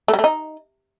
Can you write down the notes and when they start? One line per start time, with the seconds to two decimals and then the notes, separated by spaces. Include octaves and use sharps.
0.08 A3
0.14 G3
0.19 A3
0.24 D#4